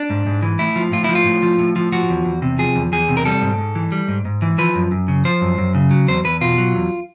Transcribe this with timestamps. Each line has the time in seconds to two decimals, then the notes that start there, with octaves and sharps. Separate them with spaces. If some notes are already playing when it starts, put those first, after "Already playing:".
Already playing: D4
0.10 G#2
0.26 G#2
0.43 E3
0.59 A2 E4
0.76 F3
0.92 A2 F4
1.04 F3 E4
1.15 F4
1.26 A2
1.43 F3
1.59 A2
1.76 F3
1.92 F3 F#4
2.09 E2
2.25 E2
2.42 C3
2.58 F3 G#4
2.75 E2
2.92 E2 G#4
3.09 C3
3.17 A#4
3.25 G3 A4
3.42 G#2
3.58 G#2
3.75 E3
3.92 G3
4.08 G#2
4.25 G#2
4.42 E3
4.58 F3 B4
4.75 F#2
4.91 F#2
5.08 C#3
5.25 F3 C5
5.41 F#2
5.58 F#2
5.75 C#3
5.91 F#3
6.08 E2 C5
6.24 E2 B4
6.41 B2 F4
6.58 F#3
6.75 E2